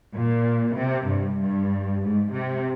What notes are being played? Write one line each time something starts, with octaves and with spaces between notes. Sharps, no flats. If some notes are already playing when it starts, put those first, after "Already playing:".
A#2
C3
G2
G2
G#2
C3